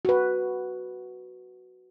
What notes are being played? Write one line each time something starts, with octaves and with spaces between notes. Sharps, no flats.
F#4 B4